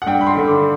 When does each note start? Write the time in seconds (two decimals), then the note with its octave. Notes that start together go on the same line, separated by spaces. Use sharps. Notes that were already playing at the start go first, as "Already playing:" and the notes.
0.02 F#5
0.06 G2 G5
0.21 B5
0.27 C6
0.37 D3
0.48 D6